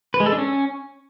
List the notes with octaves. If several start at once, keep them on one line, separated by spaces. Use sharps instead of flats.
B4
G#3
A4
D4
C#4